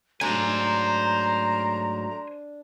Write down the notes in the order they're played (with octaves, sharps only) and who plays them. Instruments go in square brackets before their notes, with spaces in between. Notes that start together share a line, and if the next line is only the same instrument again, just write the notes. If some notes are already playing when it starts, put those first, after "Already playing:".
[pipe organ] G#2 F#3 A3 [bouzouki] D4 [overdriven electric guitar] C5 G#5 [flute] A#5